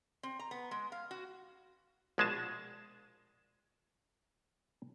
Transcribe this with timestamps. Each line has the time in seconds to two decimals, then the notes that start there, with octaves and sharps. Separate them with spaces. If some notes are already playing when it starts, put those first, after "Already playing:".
0.23 C4
0.39 A#5
0.51 B3
0.71 G#3
0.92 F5
1.11 F#4
2.18 A#1 B2 G#3 G#4 G#5 A5